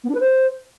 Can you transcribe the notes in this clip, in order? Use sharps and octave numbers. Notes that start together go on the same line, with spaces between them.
B3
D4
B4
C5